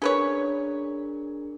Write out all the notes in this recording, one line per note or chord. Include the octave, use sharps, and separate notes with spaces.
C#4 D4 G#4 A#4 B4 C#5